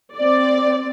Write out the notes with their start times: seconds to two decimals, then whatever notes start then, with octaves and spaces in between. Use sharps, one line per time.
0.16 C4 D5